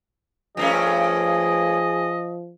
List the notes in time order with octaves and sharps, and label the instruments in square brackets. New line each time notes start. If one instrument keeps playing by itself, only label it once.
[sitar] G2 A3 C#4 [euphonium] F3 [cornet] G#4 [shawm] D#5